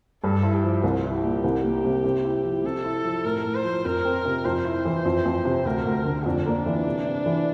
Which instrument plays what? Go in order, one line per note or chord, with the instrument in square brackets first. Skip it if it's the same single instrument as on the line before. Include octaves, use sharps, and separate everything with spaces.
[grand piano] G2 [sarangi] A4
[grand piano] E4
[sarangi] G4
[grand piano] F3
[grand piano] C2 [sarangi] F4
[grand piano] E4
[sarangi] G4
[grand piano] A#2
C2
A#3
C3
C3
E4
F3
[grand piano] C3 [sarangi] A4
[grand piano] E4
F3
[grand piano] A2 [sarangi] A#4
[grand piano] A2
[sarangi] C5
[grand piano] F3
[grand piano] F2 [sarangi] A#4
[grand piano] C4
C3
[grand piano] F2 [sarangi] C5
[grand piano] E4
E3
F2
F2
C3
[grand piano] D2 [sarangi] A#4
[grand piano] D2
D3
[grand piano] F2 [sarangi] D4
[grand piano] A#3
E3
C3
C3
E3